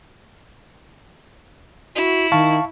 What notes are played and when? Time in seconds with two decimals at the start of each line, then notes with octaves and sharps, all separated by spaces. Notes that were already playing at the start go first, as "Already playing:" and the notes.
1.96 E4 F#4
2.32 D#3 F5 A5 C#6